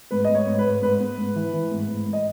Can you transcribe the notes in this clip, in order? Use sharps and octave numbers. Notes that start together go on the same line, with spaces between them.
G#2 B4
G#2 D#5
C#5
G#2
B4
G#2
G#2 B4
B3
G#2
E3
E3
G#2
G#2
G#2
D#5